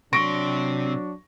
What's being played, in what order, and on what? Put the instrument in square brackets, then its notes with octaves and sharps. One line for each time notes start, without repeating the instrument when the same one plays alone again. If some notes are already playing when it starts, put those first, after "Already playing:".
[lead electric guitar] C3 C6 [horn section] F#3 D4 [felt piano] C#6 A#6 D7